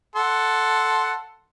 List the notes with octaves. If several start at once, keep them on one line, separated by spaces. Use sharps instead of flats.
A4 F#5 C6